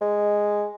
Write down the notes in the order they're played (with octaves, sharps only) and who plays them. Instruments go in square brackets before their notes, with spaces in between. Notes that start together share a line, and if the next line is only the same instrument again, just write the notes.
[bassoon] G#3